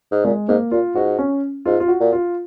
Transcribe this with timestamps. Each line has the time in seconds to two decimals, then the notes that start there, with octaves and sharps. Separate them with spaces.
0.12 G#2
0.25 A#2 G#3
0.49 G#2 A#3
0.71 A#2 F4
0.95 G#2 F#4
1.18 C#4
1.65 G#2 F4
1.80 F4
1.88 F#4
2.00 A#2
2.13 F4